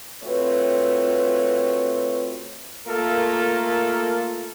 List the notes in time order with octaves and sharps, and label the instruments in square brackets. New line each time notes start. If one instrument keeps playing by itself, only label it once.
[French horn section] A3 C4 F4 F#4 B4 C#5
[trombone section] A3 A#3 F4 A4 A#4